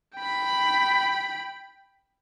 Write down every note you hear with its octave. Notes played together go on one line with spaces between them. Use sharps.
G5 B5